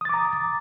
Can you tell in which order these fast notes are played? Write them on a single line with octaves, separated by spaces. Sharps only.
D#6 A6 D6 A#5